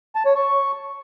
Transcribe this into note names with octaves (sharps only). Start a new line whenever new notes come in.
A5
C#5
C#6